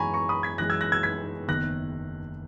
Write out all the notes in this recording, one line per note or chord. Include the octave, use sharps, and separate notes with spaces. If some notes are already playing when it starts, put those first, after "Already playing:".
Already playing: F#2 E3 G#3 B3 G#5 A#5 B5 C#6
A#5 C#6
B5 D#6
G#6 B6
F#2 E3 G#3 F#6 A#6
E6 G#6
F#6 A#6
E6 G#6
G#6 B6
F#1 E2 D#3 F#6 A#6